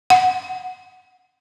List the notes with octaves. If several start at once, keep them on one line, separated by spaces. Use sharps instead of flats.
F#5